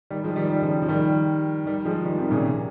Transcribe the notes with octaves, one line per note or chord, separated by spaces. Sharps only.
D#3 G3
F3 G#3
D#3 G3
D#3 G3
C#3 F3
F3
D#3 G3
D#3 G3
F3 G#3
D#3 G3
C3 D#3
A#2 C#3